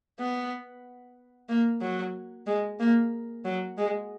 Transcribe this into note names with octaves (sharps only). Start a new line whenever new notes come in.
B3
A#3
F#3
G#3
A#3
F#3
G#3